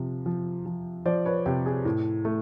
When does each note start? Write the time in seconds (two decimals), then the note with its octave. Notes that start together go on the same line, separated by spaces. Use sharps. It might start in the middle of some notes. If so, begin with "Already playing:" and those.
Already playing: C3 F3
0.26 F3
0.66 F3
1.05 F3 C5 D5
1.25 B4 C#5
1.46 C3 G4
1.66 G#4
1.85 A2
2.25 A3